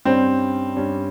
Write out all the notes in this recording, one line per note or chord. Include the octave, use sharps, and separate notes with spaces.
G2 G3 C4 C#4
G2 G3 C#4